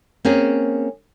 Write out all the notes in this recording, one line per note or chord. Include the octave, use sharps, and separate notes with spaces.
A#3 C4 C#4 G#4